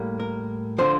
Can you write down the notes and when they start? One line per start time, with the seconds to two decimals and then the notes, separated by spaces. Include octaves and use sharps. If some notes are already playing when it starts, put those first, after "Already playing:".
Already playing: A2 G3 A#3
0.20 A#4
0.78 D3 F3 C5